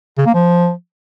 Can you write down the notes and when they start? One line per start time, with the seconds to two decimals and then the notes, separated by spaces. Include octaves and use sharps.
0.18 C#3
0.26 A#3
0.34 F3